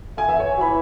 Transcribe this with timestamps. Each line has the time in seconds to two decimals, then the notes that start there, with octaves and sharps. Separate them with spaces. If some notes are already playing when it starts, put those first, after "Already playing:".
0.17 A3 G#5
0.28 B3 E5
0.40 C#5
0.57 F#3
0.61 E3 B5